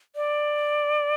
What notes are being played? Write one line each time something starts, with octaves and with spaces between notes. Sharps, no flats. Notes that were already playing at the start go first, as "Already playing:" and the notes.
D5